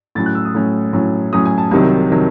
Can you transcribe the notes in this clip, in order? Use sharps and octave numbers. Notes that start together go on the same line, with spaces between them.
A2 F#3 C#4 A6
F#6
E6
D#6
A2 F#3 C#4
A2 F#3 C#4
A2 F#3 C#4 D#6
G#5
A5
C2 C3 D#3 F#3
C3 D#3 F#3